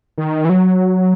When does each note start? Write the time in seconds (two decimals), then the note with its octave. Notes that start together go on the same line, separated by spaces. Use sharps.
0.18 D#3
0.45 E3
0.49 F#3